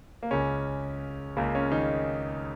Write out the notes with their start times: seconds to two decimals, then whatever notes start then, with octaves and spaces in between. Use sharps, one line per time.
0.23 A#3
0.31 C#2 C#3 C#4
1.37 C#2 C#3 A#3
1.55 C#4
1.72 D#3 D#4